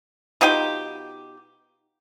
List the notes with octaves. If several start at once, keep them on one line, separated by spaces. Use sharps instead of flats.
B2 D#4 F4 G4